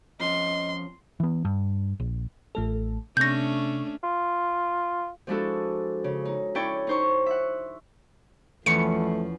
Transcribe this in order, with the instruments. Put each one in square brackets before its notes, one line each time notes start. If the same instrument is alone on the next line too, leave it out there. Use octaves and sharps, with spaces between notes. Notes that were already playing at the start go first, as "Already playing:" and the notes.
[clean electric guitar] F2 F3 C#4 [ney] D#5 [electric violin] C6
[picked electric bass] E3 B3
G2
A#1
[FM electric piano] A1 A3 A4
[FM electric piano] C3 C#6 [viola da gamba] A3 C#4 D4 [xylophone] G6 A#6
[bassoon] F4
[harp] F3 G#3 D4 E4 F#4 A4
C#3
D#4
C#4 E4 C#5 D5 G5
D#4 C5 C#6
E5 F#5
[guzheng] E2 B3 C#4 [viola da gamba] F3 [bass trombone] A3 [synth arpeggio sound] C#7